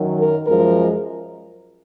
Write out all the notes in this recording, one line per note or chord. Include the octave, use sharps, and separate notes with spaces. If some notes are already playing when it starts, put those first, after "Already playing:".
Already playing: F#2 D#3 F#3
A#4
F#2 F3 G#3 A#4